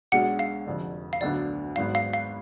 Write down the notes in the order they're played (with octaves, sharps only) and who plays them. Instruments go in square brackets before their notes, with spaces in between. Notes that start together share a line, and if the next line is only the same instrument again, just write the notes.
[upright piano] B1 B2 G#3 D4 [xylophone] F#5
[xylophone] F5
[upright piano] F1 F2 D3
[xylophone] F5
[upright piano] D2 D3 F#3 B3 D4 [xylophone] D5
[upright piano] G#1 G#2 F#3 B3 [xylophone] F5
[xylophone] F5
F5